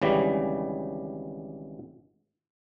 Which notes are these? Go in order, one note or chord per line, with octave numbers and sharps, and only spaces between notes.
G#1 C#3 E3 G3